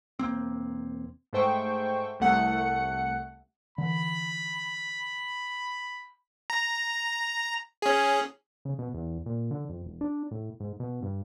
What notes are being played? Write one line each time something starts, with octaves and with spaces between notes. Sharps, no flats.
E1 A#3 C4
G#2 A3 C5 G5 C#6
C2 A3 F#5 C#7
D3 E3 B5
A#5
C#4 G#4
C#3
B2
E2
A#2
D3
F2
E1
D4
A2
G#2
B2
G2